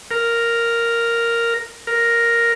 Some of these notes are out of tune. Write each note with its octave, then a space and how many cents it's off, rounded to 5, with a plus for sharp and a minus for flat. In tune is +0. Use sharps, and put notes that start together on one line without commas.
A#4 -5
A#4 +0